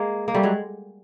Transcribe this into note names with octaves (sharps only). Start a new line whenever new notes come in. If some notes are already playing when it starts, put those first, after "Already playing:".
Already playing: G#3 A#3
A#3
G3 A3
F#3 G#3